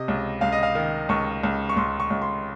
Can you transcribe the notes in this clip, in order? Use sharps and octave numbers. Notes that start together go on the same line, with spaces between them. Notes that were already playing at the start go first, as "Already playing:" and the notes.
Already playing: C3 D#5
C#2
C#2 F5
D#5
F5
D#3
C#2 C#6
C#2
C#6
C#2 C6
C#6
C#2
C6